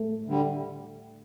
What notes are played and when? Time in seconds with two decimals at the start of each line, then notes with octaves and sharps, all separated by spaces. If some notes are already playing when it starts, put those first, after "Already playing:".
Already playing: A3
0.26 D2 D3 G3